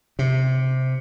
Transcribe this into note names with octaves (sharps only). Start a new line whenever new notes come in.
C3